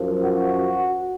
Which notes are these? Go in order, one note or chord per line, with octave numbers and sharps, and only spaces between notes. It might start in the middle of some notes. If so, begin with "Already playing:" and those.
Already playing: F#2 F3
F#4